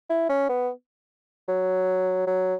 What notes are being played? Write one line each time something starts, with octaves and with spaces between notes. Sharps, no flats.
E4
C#4
B3
F#3
F#3